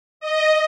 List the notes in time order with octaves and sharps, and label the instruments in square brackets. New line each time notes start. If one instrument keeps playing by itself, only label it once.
[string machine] D#5